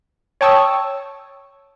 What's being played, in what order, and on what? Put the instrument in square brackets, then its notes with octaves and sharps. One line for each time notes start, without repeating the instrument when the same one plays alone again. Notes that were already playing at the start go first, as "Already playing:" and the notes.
[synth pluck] C#5 G5 A5 C#6 D#6 E6